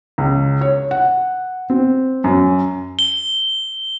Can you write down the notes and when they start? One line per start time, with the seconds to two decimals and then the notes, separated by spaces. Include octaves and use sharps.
0.18 C#2
0.61 C#5
0.91 F#5
1.70 C4
2.24 F#2
2.99 G7